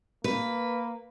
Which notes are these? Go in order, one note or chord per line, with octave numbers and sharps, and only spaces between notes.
A#3 B4